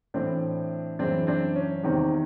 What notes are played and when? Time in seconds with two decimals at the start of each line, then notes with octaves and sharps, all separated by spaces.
0.14 A2 E3 C4 D4
0.99 F#2 C#3 E3 C4 D4
1.27 C4 D4
1.56 C#4
1.83 E2 C3 D#3 C4